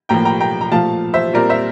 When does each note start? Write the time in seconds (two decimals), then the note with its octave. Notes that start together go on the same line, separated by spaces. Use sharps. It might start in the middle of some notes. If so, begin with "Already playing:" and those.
0.09 A2 F3 A#3 G5 A#5
0.25 G5 A#5
0.41 G5 A#5
0.61 A#5
0.72 A#2 F3 A3 F5 A5
1.14 C5 E5
1.34 A#2 G3 C4 A#4 D5
1.50 C5 E5